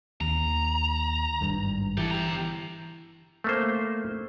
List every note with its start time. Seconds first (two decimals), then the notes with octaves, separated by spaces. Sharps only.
0.21 D#2 A#5
1.41 G#1 G2
1.98 E3 G4 A4
2.11 G4 A#5
3.44 A3 A#3 C5